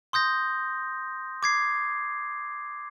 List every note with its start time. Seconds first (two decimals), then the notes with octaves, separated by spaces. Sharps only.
0.13 C6 D#6 G6 A#6
1.43 D6 G#6 C7